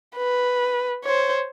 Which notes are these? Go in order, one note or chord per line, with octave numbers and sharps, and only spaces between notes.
B4
C5 C#5